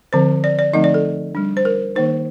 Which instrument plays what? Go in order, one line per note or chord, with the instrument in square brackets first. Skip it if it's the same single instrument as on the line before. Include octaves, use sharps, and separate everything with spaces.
[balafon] D3 F3 C4 C5
D5
D5
D3 F3 A3 C4 D#4 D#5
D5
A4
G3 D4
C5
A#4
D#3 A#3 D#4 C5